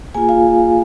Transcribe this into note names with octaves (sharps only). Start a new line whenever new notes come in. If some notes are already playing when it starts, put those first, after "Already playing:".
A#3 F4 G#4 G#5
F4 F5